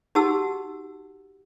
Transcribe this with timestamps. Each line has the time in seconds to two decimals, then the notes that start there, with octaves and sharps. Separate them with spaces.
0.15 D#4 F#4 G4 F#5 A5 E6